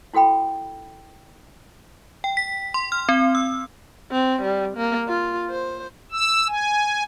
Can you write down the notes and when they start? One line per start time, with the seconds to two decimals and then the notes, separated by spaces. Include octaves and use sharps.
0.14 E4 F#4 A4 G5 B5
2.24 G5
2.37 B6
2.74 C6
2.92 F6
3.09 C4
3.35 E6
4.12 C4
4.42 G3
4.77 A#3
5.08 F4
5.50 C5
6.12 E6
6.48 G#5